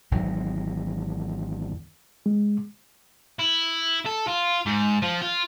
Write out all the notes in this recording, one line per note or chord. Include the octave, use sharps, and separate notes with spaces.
G#1 E2 D#3 F#3
G#3
E4
A4
F4
G#2
F3
F4